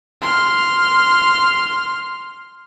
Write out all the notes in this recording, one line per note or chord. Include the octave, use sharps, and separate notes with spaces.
C6 F6